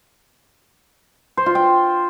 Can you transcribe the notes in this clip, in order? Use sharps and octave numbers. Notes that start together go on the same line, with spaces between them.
C5
F4
G5